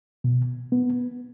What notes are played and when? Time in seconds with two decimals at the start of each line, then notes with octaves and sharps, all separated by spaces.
0.24 B2
0.72 B3